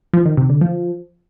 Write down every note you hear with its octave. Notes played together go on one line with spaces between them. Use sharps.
F3
D#3
C3
D3
F3